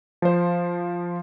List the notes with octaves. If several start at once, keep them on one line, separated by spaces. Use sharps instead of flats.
F3 C5